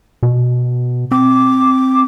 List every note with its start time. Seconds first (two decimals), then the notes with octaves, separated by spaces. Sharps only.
0.23 B2
1.12 C4 D6